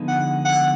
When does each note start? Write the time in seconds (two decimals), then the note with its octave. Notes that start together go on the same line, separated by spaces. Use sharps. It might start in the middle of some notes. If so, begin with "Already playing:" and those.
Already playing: D3 F3 G#3 B3 D#4
0.08 F#5
0.45 F#5